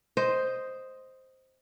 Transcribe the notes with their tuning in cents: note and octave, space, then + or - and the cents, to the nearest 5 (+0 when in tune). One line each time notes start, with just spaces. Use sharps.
C5 +0 D#5 +0